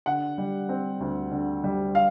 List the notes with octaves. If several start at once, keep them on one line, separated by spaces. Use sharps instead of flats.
D3 F#5
G3
C4
D2
D3
G3
F5